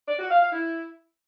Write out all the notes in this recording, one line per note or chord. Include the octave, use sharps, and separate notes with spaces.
D5
F#4
F5
F5
E4